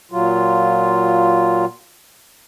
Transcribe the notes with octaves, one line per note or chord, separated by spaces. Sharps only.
A#2 F#3 F4